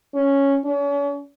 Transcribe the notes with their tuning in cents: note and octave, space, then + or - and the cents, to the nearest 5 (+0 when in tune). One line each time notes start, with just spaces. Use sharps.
C#4 +0
C#4 +40